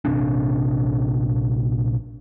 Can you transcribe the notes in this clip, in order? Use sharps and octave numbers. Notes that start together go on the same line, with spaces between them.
A#1 C3 C4 D4